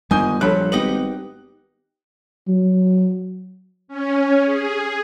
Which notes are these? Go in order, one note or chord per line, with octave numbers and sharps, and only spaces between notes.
G1 G#2 D#3 G3 G#5 D#6 G6
A#1 F3 F#3 A4 B5 F#6
G#1 B3 D#4 G4 F#7
F#3
C#4
G#4